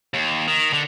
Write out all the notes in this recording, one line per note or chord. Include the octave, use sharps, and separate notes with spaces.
D#2
D#3
D3